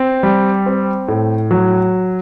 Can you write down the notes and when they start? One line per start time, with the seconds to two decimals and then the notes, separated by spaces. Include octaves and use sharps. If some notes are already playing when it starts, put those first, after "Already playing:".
Already playing: C4
0.23 G3
0.66 C4
1.08 A2
1.51 F#3